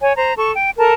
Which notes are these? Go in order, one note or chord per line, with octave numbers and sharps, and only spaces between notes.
C#5 G#5
C5 A#5
A4 C#6
G5
A4 A#4 A5